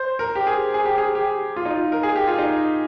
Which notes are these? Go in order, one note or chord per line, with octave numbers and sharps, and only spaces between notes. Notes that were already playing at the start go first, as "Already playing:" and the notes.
Already playing: C5
A#4
G4
G#4
G#4
G4
G#4
G4
F4
D#4
F4
A#4
G#4
G4
F4
D#4